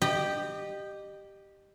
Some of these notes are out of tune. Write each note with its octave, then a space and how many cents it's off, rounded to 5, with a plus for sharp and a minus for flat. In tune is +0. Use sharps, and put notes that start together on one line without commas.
G4 +0 D#5 -30